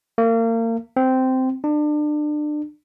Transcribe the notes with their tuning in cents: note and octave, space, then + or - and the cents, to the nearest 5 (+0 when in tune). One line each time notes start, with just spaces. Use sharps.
A#3 -35
C4 -10
D4 +30